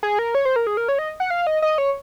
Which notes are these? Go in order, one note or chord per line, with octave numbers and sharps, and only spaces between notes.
G#4
A#4
C#5
C5
A#4
G#4
A#4
C#5
D#5
F#5
F5
D#5
D#5
C#5